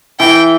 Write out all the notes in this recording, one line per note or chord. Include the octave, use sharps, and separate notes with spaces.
E3 G5